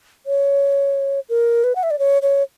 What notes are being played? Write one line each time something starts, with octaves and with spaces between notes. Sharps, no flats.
C#5
A#4
B4
F#5
E5
D5
C#5
C#5